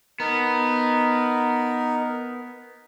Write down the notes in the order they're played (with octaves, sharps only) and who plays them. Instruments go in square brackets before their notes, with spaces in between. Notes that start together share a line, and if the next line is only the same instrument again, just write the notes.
[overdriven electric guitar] B3 [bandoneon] D#4 A#4